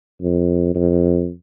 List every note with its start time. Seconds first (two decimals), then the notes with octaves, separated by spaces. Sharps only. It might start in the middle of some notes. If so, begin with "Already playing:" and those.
0.22 F2
0.75 F2